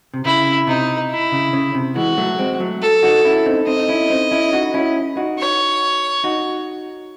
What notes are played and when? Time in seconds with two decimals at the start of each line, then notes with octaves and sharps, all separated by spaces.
0.14 C3
0.24 C#3 E4
0.67 C3 D#4
1.11 E4
1.32 C#3
1.53 C#3
1.75 C3
1.96 E3 G#3 F#4
2.17 F#3 A3
2.38 G#3 C4
2.60 F#3 A3
2.82 A4
3.03 D#4 F#4
3.25 C#4 E4
3.46 C4 D#4
3.67 C4 D#4 D#5
3.79 D#4
3.88 C#4 E4
4.10 C4 D#4
4.31 C#4 E4
4.53 D#4 F#4
4.74 C#4 E4
5.17 D#4 F#4
5.39 C#5
6.24 D#4 F#4